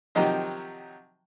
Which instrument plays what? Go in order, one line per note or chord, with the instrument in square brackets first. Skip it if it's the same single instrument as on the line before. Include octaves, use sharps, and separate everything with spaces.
[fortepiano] C3 D#3 F3 F#3 D#4 G4